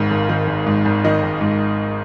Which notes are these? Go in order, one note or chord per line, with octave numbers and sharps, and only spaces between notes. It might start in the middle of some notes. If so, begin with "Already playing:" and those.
Already playing: G#1 G#2 D#3 F5
G#1
D#3
G#1
G#2
G#1
D#3 D#5
G#1
G#2